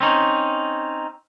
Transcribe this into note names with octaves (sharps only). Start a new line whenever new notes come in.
C4 C#4 D#4